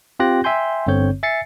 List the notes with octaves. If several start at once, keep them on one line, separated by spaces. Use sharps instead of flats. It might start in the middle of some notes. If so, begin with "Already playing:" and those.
C4 F4 G4 G5 F#6 A#6
E5 G5 G#5 C6 G6
G1 G2 D3 C4 C#5 G6
E5 G#5 A6 C7 C#7